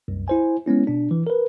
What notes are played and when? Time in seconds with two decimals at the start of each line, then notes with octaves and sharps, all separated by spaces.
0.08 C2 F#2
0.28 E4 C5 G#5
0.66 G#3 B3 C#4 E4
0.87 B2 D4
1.11 E3
1.27 A#4 B4